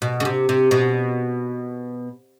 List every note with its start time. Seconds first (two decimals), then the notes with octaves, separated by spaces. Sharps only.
0.02 B2
0.20 C#3
0.25 C3
0.49 C3
0.71 B2